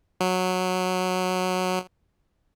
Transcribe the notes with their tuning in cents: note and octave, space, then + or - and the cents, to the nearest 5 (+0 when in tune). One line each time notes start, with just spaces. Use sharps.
F#3 -10